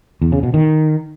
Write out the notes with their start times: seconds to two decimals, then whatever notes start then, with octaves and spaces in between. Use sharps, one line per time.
0.22 E2
0.32 C#3
0.43 B2
0.54 D#3